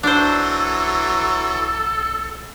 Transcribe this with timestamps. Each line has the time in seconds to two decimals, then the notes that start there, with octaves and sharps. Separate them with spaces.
0.03 B1 E3 F#3 D4 A4 C5